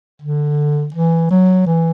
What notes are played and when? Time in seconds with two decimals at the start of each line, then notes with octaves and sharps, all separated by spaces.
0.22 D3
0.95 E3
1.31 F#3
1.67 E3